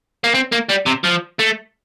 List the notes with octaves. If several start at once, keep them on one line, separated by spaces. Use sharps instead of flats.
A#3
C4
A#3
G3
C3
F3
A3